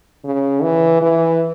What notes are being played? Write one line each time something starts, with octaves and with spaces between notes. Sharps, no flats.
C#3
E3
E3